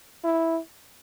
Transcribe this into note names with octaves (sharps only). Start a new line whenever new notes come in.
E4